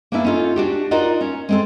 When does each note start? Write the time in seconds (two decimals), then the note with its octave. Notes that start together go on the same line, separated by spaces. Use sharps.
0.12 A#3 B3 C#4 D4 E4
0.24 C#4 D#4 F4 A4
0.56 D4 F#4 G4
0.91 D#4 F4 F#4 A#4 D5 D#5
1.21 C#4
1.49 G#3 C4 A4